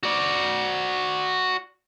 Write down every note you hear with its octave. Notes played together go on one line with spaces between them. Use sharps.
F#4 D5